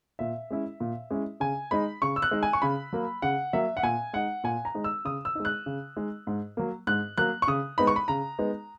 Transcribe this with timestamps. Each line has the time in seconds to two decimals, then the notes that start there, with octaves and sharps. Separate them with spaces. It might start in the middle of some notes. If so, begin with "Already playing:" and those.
0.19 A#2 E5
0.50 G#3 C#4 E4
0.80 A#2
1.11 G#3 C#4 E4
1.40 C#3 G#5
1.71 G#3 D#4 B5
2.02 C#3 C#6
2.16 E6
2.22 F#6
2.31 G#3 D#4
2.43 G#5
2.53 C#6
2.62 C#3 B5
2.93 F#3 A#3
3.22 C#3 F#5
3.53 F#3 A#3 E5
3.77 F#5
3.83 A#2 G#5
4.13 G#3 D#4 F#5
4.44 A#2 G#5
4.65 A#5
4.75 G#3 D#4
4.84 E6
5.05 C#3 D#6
5.25 E6
5.35 G#3 D#4
5.45 F#6
5.66 C#3
5.97 G#3 D#4
6.27 G#2
6.57 F#3 A#3
6.87 G#2 F#6
7.18 F#3 A#3 F#6
7.42 C#6
7.48 C#3 D#6
7.78 G#3 B3 D#4 B5
7.87 C#6
7.96 B5
8.08 C#3 A#5
8.39 G#3 B3 D#4